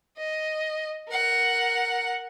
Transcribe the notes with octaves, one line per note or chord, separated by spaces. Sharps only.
D#5
A#4 F#5